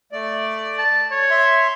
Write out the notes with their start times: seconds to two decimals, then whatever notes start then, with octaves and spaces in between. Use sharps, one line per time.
0.12 A3 D5
0.78 A5
1.11 C#5
1.30 E5 C6